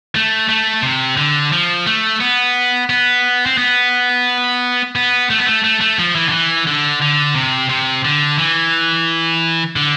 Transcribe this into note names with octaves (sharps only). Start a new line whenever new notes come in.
A3
A3
C3
D3
F3
A3
B3
B3
C4
B3
B3
A3
B3
A3
A3
A3
F3
E3
D3
E3
D3
D3
C3
C3
D3
E3
D3